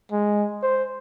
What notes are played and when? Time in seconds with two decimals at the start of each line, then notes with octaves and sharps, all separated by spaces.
0.12 G#3
0.63 C5